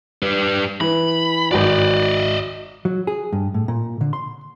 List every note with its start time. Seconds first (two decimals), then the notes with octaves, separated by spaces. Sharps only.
0.23 G3 B4
0.81 E3 B5
1.51 G#1 F#4 D5 D#5
2.85 F#3
3.07 G#4
3.33 G2
3.54 A2
3.68 A#2
4.01 D3
4.13 C6